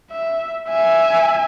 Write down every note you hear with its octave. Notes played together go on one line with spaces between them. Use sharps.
E5
E5 G#5